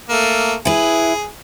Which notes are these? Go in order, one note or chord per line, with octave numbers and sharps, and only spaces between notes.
A3 A#3
E4 G#4 B4